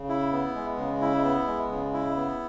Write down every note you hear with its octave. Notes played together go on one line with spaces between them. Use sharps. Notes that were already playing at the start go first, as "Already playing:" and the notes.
Already playing: C#3
E4
B3
G#3
C#3
E4
B3
G#3
C#3
E4
B3